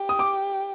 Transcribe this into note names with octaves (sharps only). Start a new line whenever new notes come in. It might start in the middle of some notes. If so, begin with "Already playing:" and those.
Already playing: G4
D#6
D6